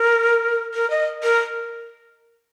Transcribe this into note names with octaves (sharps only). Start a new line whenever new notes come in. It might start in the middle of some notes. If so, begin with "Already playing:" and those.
Already playing: A#4
A#4
D#5
A#4